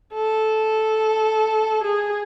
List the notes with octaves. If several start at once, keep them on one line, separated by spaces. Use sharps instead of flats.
A4
G#4